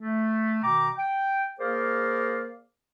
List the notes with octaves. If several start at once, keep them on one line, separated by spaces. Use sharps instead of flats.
A3
B2 D#3 G5 A#5 D6
G5
A#3 G#4 A#4 C5 D5 F5